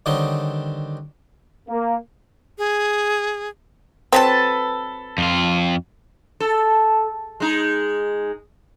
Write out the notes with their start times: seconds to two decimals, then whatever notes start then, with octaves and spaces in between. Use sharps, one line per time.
0.06 D3 D#3 G3 C4 D#4 C#5
1.69 A#3
2.58 G#4
4.13 F#3 C4 A4 B4 A5
5.18 F2 F4
6.40 A4
7.40 G#3 D#4